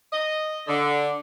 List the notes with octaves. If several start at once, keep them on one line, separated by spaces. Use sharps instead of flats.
D#5
D3